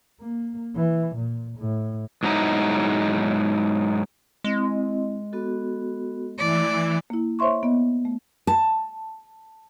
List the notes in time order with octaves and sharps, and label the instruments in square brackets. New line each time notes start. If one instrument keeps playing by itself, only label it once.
[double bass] A#3
E3
A#2
A2
[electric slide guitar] G#2 F#3 B3 C#4 D#4 E4
[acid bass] G#3 [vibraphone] C4 E4 D#5
[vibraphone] B3 F#4 A4
[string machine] E3 [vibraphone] A3 [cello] D5
[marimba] A#3 E4
C5 C#5 E5 C6 C#6
B3 D#5
A3
[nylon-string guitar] A5